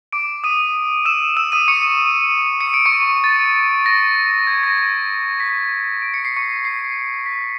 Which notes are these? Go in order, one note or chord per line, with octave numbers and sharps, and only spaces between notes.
D6 D7
D#6 D#7
E6 E7
E6 E7
D#6 D#7
C#6 C#7
C#7
D7
C#6 C#7
A6
A#6
G#6
A#6
A#6
B6
D7
C#7
C7
C#6 C#7
C7
B6